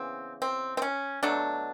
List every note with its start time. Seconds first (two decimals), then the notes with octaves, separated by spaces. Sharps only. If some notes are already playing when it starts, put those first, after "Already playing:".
Already playing: C#3 E3 B3 C4
0.42 C4
0.77 C4
0.82 C#4
1.23 B2 F#3 A3 D4